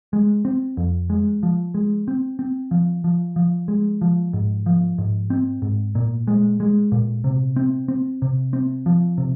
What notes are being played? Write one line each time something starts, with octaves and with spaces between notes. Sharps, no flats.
G#3
C4
F2
G#3
F3
G#3
C4
C4
F3
F3
F3
G#3
F3
G#2
F3
G#2
C4
G#2
A#2
G#3
G#3
A#2
C3
C4
C4
C3
C4
F3
C3